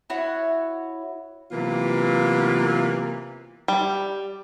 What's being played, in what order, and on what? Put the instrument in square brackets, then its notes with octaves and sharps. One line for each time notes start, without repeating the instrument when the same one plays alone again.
[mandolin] E4 F#4 C#5
[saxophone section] C3 E3 F#3 A#3 B3 F4
[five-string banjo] G3